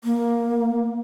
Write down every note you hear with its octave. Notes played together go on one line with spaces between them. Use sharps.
A#3